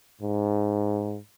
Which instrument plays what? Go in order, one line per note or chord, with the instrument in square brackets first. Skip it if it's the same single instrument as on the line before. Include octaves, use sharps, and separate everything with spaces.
[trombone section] G#2